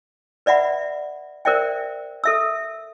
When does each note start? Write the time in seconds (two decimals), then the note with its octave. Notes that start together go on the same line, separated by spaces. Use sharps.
0.46 B4 D5 E5 F#5 B5
1.45 A#4 C5 D5 E5 G5
2.24 A4 E5 E6